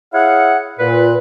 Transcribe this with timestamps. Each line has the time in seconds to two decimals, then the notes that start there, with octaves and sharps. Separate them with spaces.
0.14 E4 G#4 C#5 F5 F#5
0.79 A#2 B4